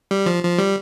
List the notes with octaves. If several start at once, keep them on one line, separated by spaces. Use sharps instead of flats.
G3
F3
F3
G3